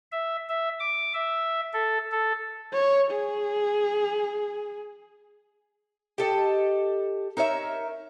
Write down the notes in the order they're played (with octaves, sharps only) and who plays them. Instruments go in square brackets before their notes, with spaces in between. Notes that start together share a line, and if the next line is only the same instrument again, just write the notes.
[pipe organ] E5
E5
D6
E5
A4
A4
[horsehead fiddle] C#5
G#4
[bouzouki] G4 A4 D#5
D#4 A#4 C#5 E5